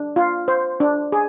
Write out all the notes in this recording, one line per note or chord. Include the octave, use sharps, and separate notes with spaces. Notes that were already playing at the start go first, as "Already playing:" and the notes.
Already playing: D4
F4
C5
D4
G#4